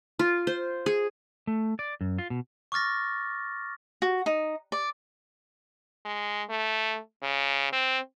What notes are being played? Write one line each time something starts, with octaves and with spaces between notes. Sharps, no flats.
F4
C5
G#4
A3
D5
F#2
F4
B2
C#6 D6 F6 A6 A#6
F#4
D#4
D5
G#3
A3
C#3
C4